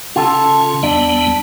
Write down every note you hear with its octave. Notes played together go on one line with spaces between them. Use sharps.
C#3 C#4 F4 A4
E2 G3 B3 D4